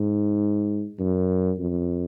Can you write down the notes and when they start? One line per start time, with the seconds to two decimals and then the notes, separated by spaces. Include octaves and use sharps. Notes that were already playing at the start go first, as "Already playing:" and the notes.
Already playing: G#2
0.99 F#2
1.59 F2